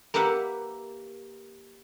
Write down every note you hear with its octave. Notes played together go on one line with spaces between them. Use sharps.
A#3 G4 B4 E5 F#5